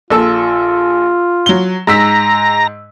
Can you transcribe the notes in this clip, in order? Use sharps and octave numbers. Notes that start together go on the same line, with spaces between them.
A#1 F4 A4 E6
F#3 G7
G#2 A#5 E6 B6